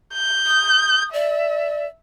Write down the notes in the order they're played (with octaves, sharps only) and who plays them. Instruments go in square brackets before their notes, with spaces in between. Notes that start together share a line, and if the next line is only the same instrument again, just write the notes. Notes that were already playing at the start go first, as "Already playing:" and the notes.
[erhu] G6
[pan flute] D#6
[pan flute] D5 [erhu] E5